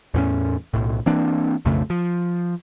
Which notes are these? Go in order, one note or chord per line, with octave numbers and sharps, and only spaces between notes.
E2 A2 C#4
B1 A2
E3 A#3 C4 D4
B1 F2 C#3 A3
F3